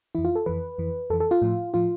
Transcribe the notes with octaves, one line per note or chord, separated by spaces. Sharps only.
F2 E3 E4
F4
A4
F2 E3 B4
F2 E3
F2 E3 A4
A4
F4
A2 F3
A2 F3 F4